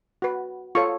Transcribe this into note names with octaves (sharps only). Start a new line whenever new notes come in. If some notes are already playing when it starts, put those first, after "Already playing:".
F#4 B4
F4 A4 C#5 C#6